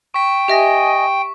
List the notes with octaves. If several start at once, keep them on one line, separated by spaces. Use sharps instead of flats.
G5 C#6 B6
G4 D#5 E5 G#5 A#6